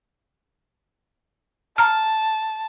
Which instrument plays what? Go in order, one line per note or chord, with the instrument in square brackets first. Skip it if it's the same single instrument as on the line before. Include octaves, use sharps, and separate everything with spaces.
[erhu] A5 [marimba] A#5 F6